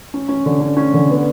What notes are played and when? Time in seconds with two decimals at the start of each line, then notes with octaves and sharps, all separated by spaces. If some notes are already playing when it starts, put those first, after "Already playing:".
0.14 C#4
0.29 C#4
0.46 D3
0.61 C#4
0.77 C#4
0.94 D3
1.10 B3